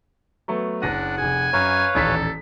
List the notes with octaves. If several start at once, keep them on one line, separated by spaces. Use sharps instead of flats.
F#3 A3 B3
F#1 D4 F#5 A#6 D#7
F1 G#4 G#5
F#2 B4 C#5 F5
D#1 A1 A4 B6